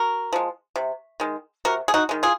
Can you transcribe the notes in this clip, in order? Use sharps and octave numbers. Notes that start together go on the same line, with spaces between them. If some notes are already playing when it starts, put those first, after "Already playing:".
Already playing: F#4 A#4
F3 G#3
C3
D#3 G#3
C3 F#4 A#4
G#4
D#4 F#4
D#3 G#3
F4 G#4